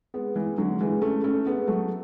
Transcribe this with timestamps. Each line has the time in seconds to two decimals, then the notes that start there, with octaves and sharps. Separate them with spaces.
0.14 G#3 B3
0.36 E3 G#3
0.58 D3 F#3
0.80 E3 G#3
1.02 A3 C#4
1.24 A3 C#4
1.46 G#3 B3
1.68 F#3 A3